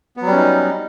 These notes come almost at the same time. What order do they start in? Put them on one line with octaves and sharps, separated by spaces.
B3 F#3 G3 C#4 D#4